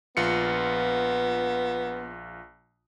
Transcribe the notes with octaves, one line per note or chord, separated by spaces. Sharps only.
A#1 B3 F4 C#7